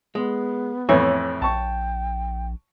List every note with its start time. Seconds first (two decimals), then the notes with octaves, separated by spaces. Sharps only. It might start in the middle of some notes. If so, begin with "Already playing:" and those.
0.15 G#3 B3
0.89 F2 A2 E3 C#5
1.42 A#1 G5 A5 C#6